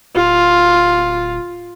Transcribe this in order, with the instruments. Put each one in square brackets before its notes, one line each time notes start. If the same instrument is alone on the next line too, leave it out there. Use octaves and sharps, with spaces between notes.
[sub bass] D1 [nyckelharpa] F4